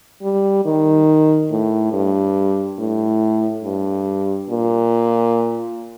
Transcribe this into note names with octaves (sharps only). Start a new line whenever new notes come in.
G3
D#3
A2
G2
A2
G2
A#2